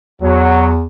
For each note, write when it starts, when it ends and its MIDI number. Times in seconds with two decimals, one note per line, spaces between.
0.22 0.86 40
0.22 0.68 54